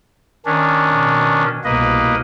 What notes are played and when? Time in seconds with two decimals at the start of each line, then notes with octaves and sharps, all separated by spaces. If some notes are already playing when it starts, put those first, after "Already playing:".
0.46 D#3 C#4 D4
0.93 B2
1.64 C2 B2 A#3 B4 D#5